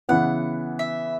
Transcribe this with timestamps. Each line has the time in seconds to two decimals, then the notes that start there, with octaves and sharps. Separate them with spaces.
0.09 C#3 E3 B3 F#5
0.79 E5